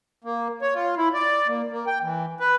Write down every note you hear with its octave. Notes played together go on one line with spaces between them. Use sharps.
A#3
C#5
F4
E4
D5
A#3
A#3
G5
E3
B4